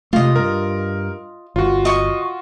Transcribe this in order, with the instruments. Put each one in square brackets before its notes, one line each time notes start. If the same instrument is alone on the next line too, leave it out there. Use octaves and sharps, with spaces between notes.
[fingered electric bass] C3 G#3 A3 [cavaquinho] F4 D#5
[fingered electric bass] G2 [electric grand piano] A#4
[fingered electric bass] G1 [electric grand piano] F4 F#4
[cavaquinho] D#5 C#6